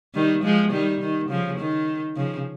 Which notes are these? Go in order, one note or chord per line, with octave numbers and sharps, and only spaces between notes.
D#3 G3
F3 G#3
D#3 G3
D#3
C#3 F3
D#3
C#3 F3